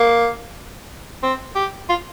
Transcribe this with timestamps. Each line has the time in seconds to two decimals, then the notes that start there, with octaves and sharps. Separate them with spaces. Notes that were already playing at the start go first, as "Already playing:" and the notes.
Already playing: A#3
1.23 C4
1.55 G4
1.89 F4